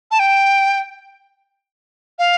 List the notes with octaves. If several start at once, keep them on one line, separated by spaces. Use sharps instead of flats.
A5
G5
F5